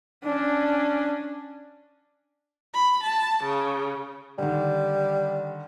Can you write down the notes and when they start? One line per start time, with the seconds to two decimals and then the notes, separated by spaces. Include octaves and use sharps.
0.24 C#4 D4
2.74 B5
3.06 A5
3.45 C#3
4.38 D3 D#3 G3